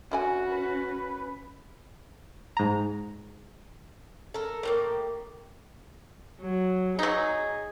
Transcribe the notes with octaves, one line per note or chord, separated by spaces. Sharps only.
D3 C#4 E4 F#4 G#5
B4
G#2 A#5
A4 A#4
A2 A#3 F4 G4 A#4
F#3
F#3 D#4 G#4